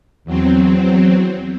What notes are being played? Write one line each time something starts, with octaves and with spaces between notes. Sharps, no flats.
E2 F#3 C4